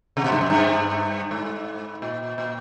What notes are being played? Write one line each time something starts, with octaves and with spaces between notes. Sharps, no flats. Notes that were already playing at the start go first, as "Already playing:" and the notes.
C3
B2
G2
F#2
G2
G#2
A#2
A#2